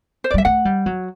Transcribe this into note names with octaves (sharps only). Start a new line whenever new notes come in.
C5
D5
G3 E5
A3 F#5
G3
F#3